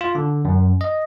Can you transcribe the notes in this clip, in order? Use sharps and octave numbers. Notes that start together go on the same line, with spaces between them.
F4
D3
F#2
D#5